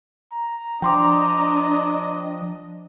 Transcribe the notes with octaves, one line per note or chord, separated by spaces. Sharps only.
A#5
F3 D4 D#5 G5 C6 D6